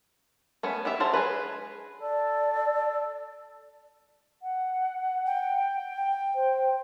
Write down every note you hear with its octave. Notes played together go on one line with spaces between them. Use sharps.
A3 B3 C#4
B3 G4 E5
F#3 C5 A5
G#3 G#4 B4
A4 D5
F#5
G5
C5